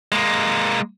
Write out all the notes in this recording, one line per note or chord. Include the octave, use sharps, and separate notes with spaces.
G#3 A#3